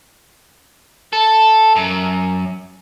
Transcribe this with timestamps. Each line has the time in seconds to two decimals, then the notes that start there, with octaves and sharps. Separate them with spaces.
1.13 A4
1.76 F#2